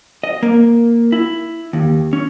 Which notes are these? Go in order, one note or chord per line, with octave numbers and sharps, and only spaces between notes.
D#5
A#3
E4
D#2
C#4